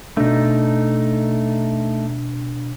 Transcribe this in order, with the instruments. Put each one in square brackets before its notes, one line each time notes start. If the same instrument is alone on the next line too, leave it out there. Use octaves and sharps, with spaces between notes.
[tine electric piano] B2 D4 [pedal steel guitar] A3 D#4